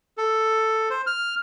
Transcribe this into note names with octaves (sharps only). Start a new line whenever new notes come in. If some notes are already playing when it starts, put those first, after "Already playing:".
A4
C5
F6